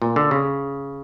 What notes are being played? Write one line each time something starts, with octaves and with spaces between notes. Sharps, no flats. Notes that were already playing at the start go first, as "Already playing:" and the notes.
A#2
D3
C#3